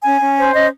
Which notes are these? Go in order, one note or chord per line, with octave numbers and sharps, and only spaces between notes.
C#4 G#5
C#4
C5
C#4 D#5